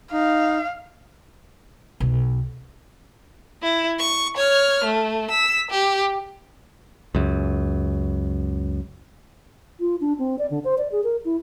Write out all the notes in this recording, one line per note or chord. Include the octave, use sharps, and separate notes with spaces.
D#4 F5
B1
E4
C#6
C#5 F6
A3
E6 B6
G4
C#2 F#2
F4
D4
C4
D5
D3
C5
D5
G#4
A#4
E4